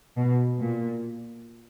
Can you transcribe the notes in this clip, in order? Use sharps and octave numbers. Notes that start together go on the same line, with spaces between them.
B2
A#2